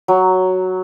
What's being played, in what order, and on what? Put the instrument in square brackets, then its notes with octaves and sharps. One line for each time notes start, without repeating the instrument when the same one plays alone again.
[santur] F#3